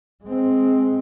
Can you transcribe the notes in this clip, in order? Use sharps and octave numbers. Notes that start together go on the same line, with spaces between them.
G#3 C4